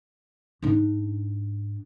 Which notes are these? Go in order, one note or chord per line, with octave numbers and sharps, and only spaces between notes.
G#2 D4